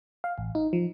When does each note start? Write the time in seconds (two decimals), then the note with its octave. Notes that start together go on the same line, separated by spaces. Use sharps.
0.24 F5
0.38 A1
0.55 D#4
0.73 F3